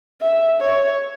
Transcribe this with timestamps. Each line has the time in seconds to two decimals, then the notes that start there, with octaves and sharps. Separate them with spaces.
0.21 E5
0.61 C#5